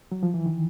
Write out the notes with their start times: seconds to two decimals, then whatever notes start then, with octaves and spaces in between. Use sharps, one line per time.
0.12 F#3
0.23 F3
0.34 E3
0.46 D#3